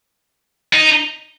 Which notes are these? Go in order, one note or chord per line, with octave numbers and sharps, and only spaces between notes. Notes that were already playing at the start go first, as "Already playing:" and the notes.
D#4